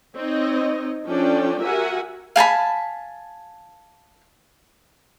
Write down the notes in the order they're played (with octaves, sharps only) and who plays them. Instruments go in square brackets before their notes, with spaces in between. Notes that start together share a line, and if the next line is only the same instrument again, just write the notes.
[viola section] C4 D#4 C#5 D#5
F3 C#4 D4 A4 D5 G5
F#4 G4 A#4 E5 F#5 G#5
[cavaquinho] F5 G#5 A5 B5